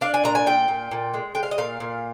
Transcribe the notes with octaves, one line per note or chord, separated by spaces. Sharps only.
D4 F5
G#5
A#2 A#5
G#5
A#2 G5
A#2
A#2
G#3
G#3 G5
F5
D#5
A#2 F5
A#2